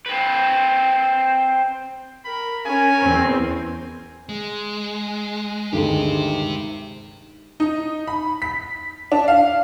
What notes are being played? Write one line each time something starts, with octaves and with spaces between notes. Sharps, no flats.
C4 B4
A#4 B5
C#4 A#4 G#5
E2 C4
G#3
D2 G2 D#3 G#3 G4 C5
D#4
B5
B6
D4
F5